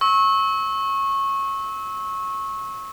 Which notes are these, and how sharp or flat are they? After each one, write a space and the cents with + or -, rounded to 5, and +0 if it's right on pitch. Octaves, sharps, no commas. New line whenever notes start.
C#6 -20 E6 -30